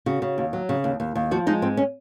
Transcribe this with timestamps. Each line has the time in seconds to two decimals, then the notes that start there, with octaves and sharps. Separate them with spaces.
0.06 C#3 F#4
0.22 C#3
0.38 D#2
0.53 F#3
0.69 C#3
0.84 D#2
1.00 D#2
1.15 D#2
1.31 F3 F#4
1.47 G#3 D#4
1.62 G#2 C4
1.77 C#4